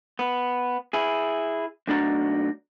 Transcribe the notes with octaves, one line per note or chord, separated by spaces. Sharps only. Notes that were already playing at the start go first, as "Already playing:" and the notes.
B3
E4 G#4
B1 A3 D4 E4 F#4 A#5